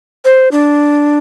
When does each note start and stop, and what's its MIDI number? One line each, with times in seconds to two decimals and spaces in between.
0.25 0.49 72
0.51 1.18 62